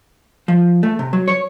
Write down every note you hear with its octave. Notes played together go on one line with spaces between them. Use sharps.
F3
A3
C3
F#3
C#5